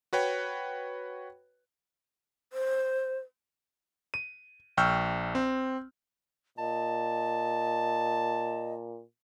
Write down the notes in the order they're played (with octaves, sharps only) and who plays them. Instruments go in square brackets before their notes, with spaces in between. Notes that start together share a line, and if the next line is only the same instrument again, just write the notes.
[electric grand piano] F#4 B4 C#5 G5
[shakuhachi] C5
[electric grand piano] D#7
A#1 G5 C#6 E6 F6 G6
C4
[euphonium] A#2 [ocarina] D#5 [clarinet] A5